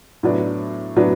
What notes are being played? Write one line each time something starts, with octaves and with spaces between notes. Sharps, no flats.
A2 F#3 B3 D4
A2 F#3 B3 D4